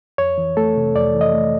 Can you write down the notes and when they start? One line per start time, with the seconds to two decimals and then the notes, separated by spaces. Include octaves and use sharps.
0.18 F2 C#5
0.38 E3
0.57 A3 A4
0.76 C3
0.95 F2 D5
1.14 E3
1.21 D#5
1.34 A3